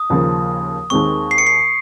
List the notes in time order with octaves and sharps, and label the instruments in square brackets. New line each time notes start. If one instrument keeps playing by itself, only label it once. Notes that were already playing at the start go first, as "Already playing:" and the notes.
Already playing: [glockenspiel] D#6
[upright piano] D#2 C#3 F3 A#3
[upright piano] D#2 D#3 G#3 C4 [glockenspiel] C#6
[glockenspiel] C7
C#7
C7